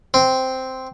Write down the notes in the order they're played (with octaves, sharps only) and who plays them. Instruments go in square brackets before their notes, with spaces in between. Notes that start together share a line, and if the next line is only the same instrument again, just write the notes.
[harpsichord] C4